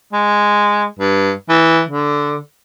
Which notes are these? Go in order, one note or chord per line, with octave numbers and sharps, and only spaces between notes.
G#3
G2
E3
D3